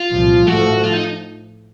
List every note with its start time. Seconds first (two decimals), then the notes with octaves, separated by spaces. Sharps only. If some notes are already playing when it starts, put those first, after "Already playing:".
Already playing: F4
0.12 C2 A#2 F3
0.47 A2 F3 A3 F#4
0.84 F4
0.93 D#4